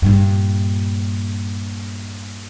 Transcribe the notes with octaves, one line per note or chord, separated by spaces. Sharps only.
G2 A#2